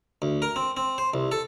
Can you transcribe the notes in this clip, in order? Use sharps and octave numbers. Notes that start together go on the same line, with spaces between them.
D2
A#4
C4
C4
C5
C2
A4